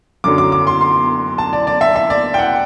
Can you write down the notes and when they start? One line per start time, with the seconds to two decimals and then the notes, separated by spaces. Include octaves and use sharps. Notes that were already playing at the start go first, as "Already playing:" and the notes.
0.24 F#2 D3 F#3 D6
0.38 D6
0.52 D6
0.67 C6
0.81 C6
1.38 A5
1.53 D5
1.67 D5
1.81 E5
1.96 E5
2.10 D5
2.34 G5
2.39 F#5